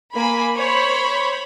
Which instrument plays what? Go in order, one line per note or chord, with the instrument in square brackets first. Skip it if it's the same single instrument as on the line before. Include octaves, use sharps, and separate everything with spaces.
[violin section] A#3 G#5 B5
C5 C#5 B5